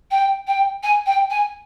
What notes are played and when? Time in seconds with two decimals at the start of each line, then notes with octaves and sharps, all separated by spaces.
0.11 G5
0.47 G5
0.83 G#5
1.06 G5
1.30 G#5